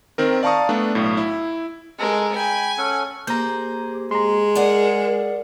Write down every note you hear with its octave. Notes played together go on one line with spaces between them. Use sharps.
D#3 C4 A#4
D5 F5 A5 A#5 C#6 D#6
A3 B3 D4
B1 A2
E4
G#3 A4 A#4
G5 G#5 B5
C#4 A4 F#5
A#3 G4 G#4 C5 A#5 G6
G#3 A#5 C6
G#4 A#4 D5 F#5